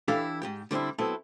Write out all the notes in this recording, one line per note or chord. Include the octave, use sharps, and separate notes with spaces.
E3 D4 E4 G4 A4 F5
G#2 G4 G5
D3 G3 C4 D4 E4
F#3 B3 C4 E4 A4